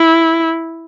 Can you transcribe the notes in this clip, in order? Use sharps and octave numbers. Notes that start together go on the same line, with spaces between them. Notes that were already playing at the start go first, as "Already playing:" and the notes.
Already playing: E4